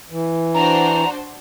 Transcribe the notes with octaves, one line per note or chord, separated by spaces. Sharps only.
E3
D4 F#4 C5 A#5